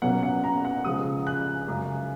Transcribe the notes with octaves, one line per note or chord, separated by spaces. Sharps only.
B2 F#3 A#3 C#4 F#5
F#5
A#5
F#5
C#3 F3 G#3 D#6
F#6
F#2 C#3 G#3